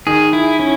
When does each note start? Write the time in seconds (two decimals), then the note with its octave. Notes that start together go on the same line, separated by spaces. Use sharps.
0.07 D#3 G#4
0.33 E4
0.59 C#4